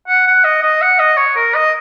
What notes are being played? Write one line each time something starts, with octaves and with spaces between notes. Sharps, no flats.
F#5
F#5
D#5
D#5
F#5
D#5
C#5
A#4
D#5